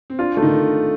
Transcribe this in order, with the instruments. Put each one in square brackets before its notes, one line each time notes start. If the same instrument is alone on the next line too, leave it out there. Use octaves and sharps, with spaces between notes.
[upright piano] C4
[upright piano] D4 [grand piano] F4
[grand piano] A3
[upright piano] D#3 D#4